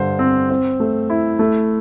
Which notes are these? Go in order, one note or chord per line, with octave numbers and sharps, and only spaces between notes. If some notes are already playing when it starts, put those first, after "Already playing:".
Already playing: G2 D3 C5
C4
C4
A3
E4
A3